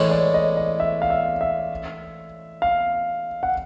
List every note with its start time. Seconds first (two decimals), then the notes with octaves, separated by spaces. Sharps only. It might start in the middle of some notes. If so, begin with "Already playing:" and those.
Already playing: A2 E3 G#3 C#4 E4 C#5
0.11 D5
0.34 D#5
0.57 D#5
0.80 E5
1.02 F5
1.10 E5
1.41 E5
2.62 F5
3.43 F#5